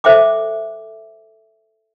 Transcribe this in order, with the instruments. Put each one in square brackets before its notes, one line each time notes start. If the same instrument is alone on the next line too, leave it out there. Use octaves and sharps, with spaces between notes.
[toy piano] A4 C5 E5 G5 D6